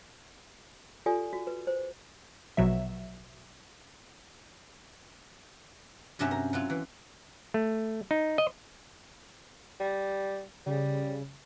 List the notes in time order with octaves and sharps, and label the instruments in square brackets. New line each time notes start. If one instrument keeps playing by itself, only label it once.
[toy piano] F4 G4 A4 D5 G#5
F#4
B4
C5
[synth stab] A#1 B2 F#3 E5
[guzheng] G2 C3 F#3 C#4 C5 E5
A#4
F#3 E4 F4
E3
[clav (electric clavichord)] A3
D#4
D#5
[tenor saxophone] G3
[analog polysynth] C#3 [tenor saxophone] G3